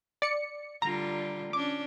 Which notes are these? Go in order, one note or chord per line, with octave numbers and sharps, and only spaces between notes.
D5 C#7
D3 G3 F4 A#5
C#4 D4 D6